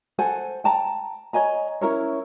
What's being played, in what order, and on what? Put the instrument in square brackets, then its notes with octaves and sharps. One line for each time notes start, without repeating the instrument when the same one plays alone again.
[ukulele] A4 C5 F#5 G#5
G5 A5 A#5
C#5 D#5 G#5 A#5
C#4 E4 A#4 C#5